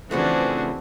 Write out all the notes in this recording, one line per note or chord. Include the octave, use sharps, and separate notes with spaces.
C#3 E3 F3 A3 C4 D4 F#4 G#4